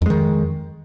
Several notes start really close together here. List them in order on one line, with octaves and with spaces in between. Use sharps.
F2 G#3 D#3